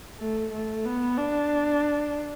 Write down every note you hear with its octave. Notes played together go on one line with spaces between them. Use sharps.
A3
A3
B3
D4